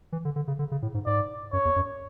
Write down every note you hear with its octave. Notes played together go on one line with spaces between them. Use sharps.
E3
D3
D3
C#3
D3
C#3
A2
G#2
G#2 D5
F#2 C#5
E2
F#2